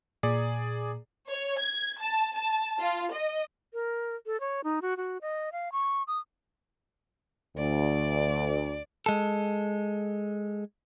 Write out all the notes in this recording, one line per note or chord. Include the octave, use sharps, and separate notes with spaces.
A#2 G#4 D5
C#5
G#6
A5
A5
F4
D#5
A#4
A4
C#5
D#4
F#4
F#4
D#5
F5
C#6
D#6
D2 D5
G#3 A4